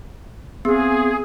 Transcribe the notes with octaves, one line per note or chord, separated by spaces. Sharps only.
B3 C4 G#4